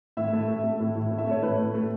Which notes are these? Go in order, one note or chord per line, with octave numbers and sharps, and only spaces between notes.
A2 E5
A3
A3
A3
A2
A2
A3
E5
A3 C#5
A2 B4
A3
A3